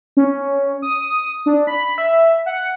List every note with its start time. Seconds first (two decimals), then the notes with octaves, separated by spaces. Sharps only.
0.17 C#4
0.82 D#6
1.46 D4
1.67 B5
1.98 E5
2.46 F#5